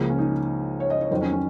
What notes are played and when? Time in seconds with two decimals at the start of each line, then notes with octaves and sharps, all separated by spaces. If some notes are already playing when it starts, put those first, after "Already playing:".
Already playing: C#2 C#3 F3 A#3
0.10 C#4
0.18 D#4
0.80 C#5
0.90 D#5
1.01 C#5
1.11 F2 D#3 F#3 C5
1.22 C#4
1.32 C#4